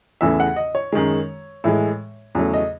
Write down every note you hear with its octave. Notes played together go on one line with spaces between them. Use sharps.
E2 C#3 E3 A3 E5
F#5
D#5
C#5
F#2 D#3 G#3
A2 E3 G#3
E2 C#3 F#3 A3
D#5